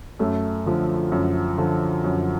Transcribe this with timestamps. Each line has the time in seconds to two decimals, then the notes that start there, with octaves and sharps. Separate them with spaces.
0.19 F#2 A3
0.66 D3 F3
1.12 F#2
1.58 D3 F3
2.04 F#2